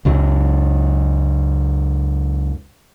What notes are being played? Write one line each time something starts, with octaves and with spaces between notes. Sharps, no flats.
C#2 F#2 F#3